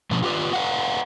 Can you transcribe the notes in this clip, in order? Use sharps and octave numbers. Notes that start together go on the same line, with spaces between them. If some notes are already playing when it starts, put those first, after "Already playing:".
B2 F3 C#4 D4
F4 G4 A4 B4 D5
B4 D5 F5 F#5